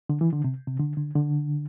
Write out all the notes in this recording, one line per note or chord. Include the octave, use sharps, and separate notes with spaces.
D3
E3
D3
C3
C3
D3
D3
D3